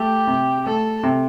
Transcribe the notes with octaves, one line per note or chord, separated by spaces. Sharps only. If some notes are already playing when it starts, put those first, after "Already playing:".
Already playing: A3 G4
C3
A3 A4
C3